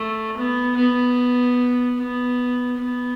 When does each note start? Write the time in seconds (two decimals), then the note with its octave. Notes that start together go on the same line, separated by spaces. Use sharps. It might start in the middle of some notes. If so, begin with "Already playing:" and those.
Already playing: A3
0.36 B3
0.77 B3
1.97 B3
2.78 B3